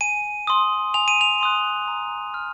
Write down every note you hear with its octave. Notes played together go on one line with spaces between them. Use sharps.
G#5 D#7
C6 D#6
G#5 F7
D#7
F7
C6 D#6 F#6
A#5
F6